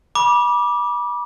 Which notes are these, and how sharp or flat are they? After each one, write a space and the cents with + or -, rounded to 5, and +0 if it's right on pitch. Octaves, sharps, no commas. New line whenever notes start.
B5 -30 D6 +0